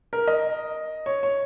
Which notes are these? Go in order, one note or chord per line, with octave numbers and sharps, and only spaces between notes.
A#4
D#5
C#5
C#5